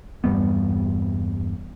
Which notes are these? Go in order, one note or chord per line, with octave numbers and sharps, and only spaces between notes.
E2 G2 G3 B3